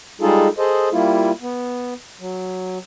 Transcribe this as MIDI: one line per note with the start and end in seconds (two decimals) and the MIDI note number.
0.21 0.48 55
0.21 0.48 56
0.21 0.48 63
0.21 0.48 65
0.21 0.48 68
0.21 0.48 69
0.58 0.89 68
0.58 0.89 69
0.58 0.89 72
0.58 0.89 75
0.93 1.31 55
0.93 1.31 58
0.93 1.31 64
0.93 1.31 65
1.42 1.94 59
2.20 2.78 54